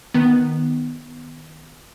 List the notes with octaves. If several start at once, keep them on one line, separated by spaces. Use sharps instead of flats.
D#3 B3